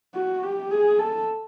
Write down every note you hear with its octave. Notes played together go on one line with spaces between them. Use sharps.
F#4
G4
G#4
A4